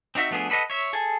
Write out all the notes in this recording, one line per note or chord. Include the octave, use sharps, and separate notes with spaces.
C4 D#4 F#4 E5
F3 A3 B3 D4 G#4
A4 B4 D5 D#5 F#5
C#5 E5
G#4 A4 G#5